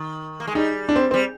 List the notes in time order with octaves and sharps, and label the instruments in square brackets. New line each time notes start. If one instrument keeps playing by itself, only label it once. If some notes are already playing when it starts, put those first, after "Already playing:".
Already playing: [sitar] D#3
A#3
G#3
[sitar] G3 [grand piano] D#4
[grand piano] D4
C4
C4
[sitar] G3